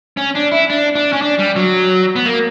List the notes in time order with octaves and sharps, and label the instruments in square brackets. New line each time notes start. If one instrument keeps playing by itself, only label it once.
[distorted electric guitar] C#4
D4
E4
D4
D4
C#4
D4
G3
F#3
B3
A#3